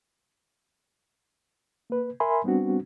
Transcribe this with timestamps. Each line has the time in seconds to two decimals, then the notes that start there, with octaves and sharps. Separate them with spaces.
1.90 A#3 B4
2.20 A#4 E5 G#5 B5 C6
2.44 G3 B3 C4 D4 F#4